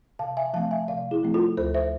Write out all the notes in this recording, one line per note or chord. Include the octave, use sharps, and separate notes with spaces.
C3 F5 A5
E5 G#5
F3 A3 C4 F5 A5
E5 G#5
C3 D5 F5
E4 G#4
F3 A3 C4
F4 A4
D2 A4 C5
C5 E5